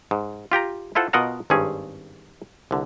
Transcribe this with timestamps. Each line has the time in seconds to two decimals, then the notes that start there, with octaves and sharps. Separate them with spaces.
0.11 G#2
0.52 F4 G4 G5 A#5
0.95 E4 F4 A4 C5 F#5
1.13 B2 F4 A#4 D#5 F#5 A#5
1.50 G#1 G2 G3 C4 C#4 G#4
2.71 C2 D3